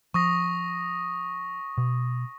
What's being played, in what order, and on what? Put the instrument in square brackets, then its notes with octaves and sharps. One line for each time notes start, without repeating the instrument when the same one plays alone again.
[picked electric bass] F3 [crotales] C#6 D#6 A#6
[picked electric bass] B2